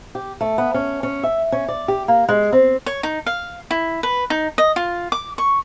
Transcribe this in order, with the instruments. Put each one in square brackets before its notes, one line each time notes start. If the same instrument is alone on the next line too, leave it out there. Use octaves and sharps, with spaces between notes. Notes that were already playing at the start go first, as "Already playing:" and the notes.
[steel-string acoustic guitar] G4
A3
B3
C#4
C#4
E5
C#4
D5
G4
A#3
G#3
C4
[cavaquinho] C#5
D#4
F5
E4
B4
D#4
D#5
F4
D6
C#6